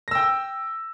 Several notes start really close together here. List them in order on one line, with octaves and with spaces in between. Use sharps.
A#6 E6 G5